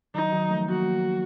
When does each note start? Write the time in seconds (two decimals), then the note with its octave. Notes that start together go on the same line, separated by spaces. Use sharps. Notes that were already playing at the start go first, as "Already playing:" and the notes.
0.14 D#3 F#3 D#4
0.32 D#3 F#3
0.51 F3 A3
0.69 F#3 A#3 F#4